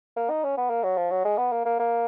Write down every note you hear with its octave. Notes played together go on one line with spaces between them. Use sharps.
A#3
D#4
C#4
B3
A#3
F#3
F3
F#3
G#3
B3
A#3
A#3
A#3